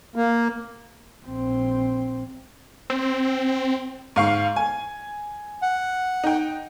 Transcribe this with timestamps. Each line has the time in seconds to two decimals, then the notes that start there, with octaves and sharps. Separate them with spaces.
0.16 A#3
1.25 A#1 C4
2.90 C4
4.16 G#2 F5 C#6
4.56 G#5
5.62 F#5
6.24 D#4 G5